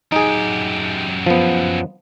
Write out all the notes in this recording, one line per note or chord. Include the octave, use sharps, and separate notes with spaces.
F#2 D#4 G4 G#4
F3 B3